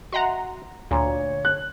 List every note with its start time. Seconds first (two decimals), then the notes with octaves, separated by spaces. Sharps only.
0.12 F#4 D#5 E5 F#5 A#5 C6
0.91 D2 A#2 C#5
1.45 F#6